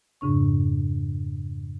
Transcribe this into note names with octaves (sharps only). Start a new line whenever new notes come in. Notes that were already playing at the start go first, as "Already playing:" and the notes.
F2 G#2 C#3 D4 C#6